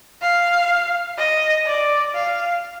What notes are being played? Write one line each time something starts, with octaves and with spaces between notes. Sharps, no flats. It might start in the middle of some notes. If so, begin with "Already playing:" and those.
F5
D#5
D5
F5